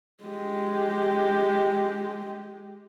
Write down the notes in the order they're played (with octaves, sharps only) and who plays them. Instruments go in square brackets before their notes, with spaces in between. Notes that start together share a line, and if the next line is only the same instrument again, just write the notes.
[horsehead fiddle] G#3 G4